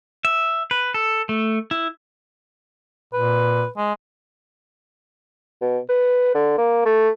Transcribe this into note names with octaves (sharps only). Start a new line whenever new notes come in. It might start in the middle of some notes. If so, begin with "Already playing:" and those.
E5
B4
A4
A3
E4
A#2 B4
G#3
B2
B4
D3
A#3
A3